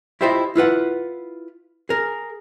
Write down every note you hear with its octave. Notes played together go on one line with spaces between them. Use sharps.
E4 F4 G4 C5 D#5 E5
E4 F4 B4 F#5
G#4 A#4